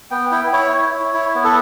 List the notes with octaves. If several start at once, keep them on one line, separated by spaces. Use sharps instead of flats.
B3 G5
E4 G5
E4 C#5
E4
E4
E4
B3
A4